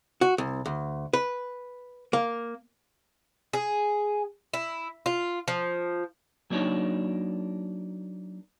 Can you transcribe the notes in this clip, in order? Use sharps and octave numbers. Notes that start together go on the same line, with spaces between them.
F#4
C2
D2
B4
A#3
G#4
E4
F4
F3
F#3 A#3 D4 D#4 C#5